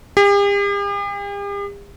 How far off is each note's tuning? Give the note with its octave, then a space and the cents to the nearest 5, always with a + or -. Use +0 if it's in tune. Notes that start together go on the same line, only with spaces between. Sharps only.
G4 +45